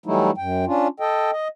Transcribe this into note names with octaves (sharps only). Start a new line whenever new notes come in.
E3 F#3 G3 A3 D#4 E4
F#2 G5
C#4 D4 F4
A4 D#5 G5
D#5